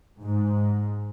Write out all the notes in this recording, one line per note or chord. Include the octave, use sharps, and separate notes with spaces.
G#2